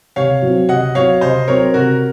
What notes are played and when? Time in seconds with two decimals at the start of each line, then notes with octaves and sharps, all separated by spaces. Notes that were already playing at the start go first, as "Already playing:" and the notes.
0.16 C3 C#5 F5
0.42 F#3 C4
0.69 C3 D#5 F#5
0.95 F#3 C4 C#5 F5
1.21 C3 C5 D#5
1.47 F#3 C4 A#4 C#5
1.74 C3 F#4 A#4